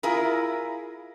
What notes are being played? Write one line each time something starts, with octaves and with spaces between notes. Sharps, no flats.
E4 F4 G#4 A#4